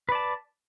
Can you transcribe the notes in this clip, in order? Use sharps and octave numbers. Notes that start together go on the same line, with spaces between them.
B4 D5 A5